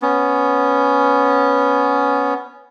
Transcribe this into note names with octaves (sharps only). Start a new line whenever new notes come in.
B3 C#4